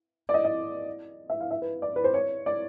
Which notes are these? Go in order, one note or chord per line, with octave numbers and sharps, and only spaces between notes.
D5
D#5
D#5
E5
F5
E5
B4
D5
B4
C5
C#5
D5